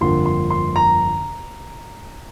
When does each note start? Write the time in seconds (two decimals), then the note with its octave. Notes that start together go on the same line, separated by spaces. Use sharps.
0.01 G1 F2 D3 F3 A#3 C6
0.26 C6
0.50 C6
0.76 A#5